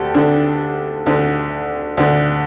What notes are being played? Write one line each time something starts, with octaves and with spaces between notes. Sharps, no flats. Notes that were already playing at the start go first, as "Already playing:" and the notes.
Already playing: D2 G4 A4
D2 D3 D4
D2 D3
D2 D3